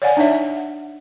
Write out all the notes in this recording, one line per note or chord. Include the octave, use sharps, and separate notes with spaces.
C#5 D5 F5 F#5 G#5
D4 D#4 C#5 E5
F#5